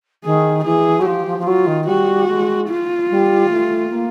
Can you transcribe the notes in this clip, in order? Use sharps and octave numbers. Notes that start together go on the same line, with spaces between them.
D#3 G#4
E3 G#4
F#3
F3 G4
F3
F3
F#3 F4
D#3
G3 F#4
G#3
F4
G3
A3
A#3